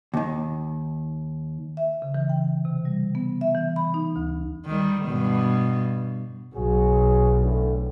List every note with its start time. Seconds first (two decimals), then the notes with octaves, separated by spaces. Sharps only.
0.14 D#2 D#3
1.77 E5
2.02 C#3
2.14 E3
2.29 G5
2.65 C3
2.85 G3
3.15 B3
3.41 E5
3.55 E3
3.76 B5
3.94 D#4
4.16 D2
4.66 D#3 G3
5.06 G2 B2
6.55 B1 F#3 F#4 G#4
7.42 A2 D3